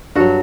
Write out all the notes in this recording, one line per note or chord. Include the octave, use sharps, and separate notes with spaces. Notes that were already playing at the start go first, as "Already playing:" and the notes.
G2 F#3 F#4 A4